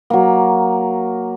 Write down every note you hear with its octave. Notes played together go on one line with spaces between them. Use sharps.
F#3 A#3